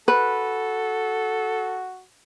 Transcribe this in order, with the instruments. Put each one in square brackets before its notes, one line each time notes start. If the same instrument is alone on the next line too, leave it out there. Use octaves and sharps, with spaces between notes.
[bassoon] F#4 [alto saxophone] A4 [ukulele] B4